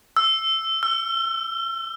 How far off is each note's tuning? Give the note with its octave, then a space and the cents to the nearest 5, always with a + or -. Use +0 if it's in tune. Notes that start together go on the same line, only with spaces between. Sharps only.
E6 +5
E6 +40